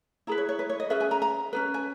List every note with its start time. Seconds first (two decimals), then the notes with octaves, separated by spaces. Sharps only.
0.27 E4 G#4 B4 A#5
0.38 C#5
0.49 C#5
0.59 B4
0.70 C#5
0.80 D#5
0.90 C#4 G#4 B4 E5
1.01 G#5
1.11 A#5
1.22 A#5
1.53 C#4 G#4 B4
1.74 G#5